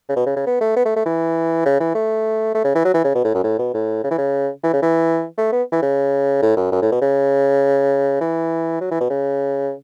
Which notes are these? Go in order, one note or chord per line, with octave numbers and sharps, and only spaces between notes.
C#3
B2
C#3
C#3
B3
A3
B3
A3
A3
E3
C#3
E3
A3
A3
C#3
E3
F#3
E3
C#3
B2
A2
F#2
A2
B2
A2
C#3
E3
C#3
E3
C#3
E3
A3
B3
E3
C#3
A2
F#2
F#2
A2
B2
C#3
E3
F#3
E3
B2
C#3